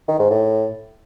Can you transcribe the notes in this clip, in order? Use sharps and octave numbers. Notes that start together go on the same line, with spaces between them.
D#3
G#2
A2